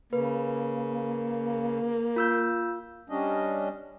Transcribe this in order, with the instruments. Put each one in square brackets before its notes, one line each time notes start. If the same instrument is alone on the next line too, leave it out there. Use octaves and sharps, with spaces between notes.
[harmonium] C#3 [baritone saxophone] A#3 [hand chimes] B4
[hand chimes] F4 E6 G6
[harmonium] G3 C#4 D4 D#5